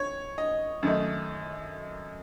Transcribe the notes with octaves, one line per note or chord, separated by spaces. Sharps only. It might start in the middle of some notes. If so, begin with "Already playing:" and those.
Already playing: C#5
D#5
F#2 D#3 A3 D#4